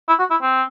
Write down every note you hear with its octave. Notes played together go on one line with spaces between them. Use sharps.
E4
F#4
E4
C4